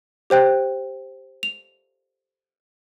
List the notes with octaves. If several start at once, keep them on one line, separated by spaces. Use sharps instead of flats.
G4 C5 G5 F#6
F7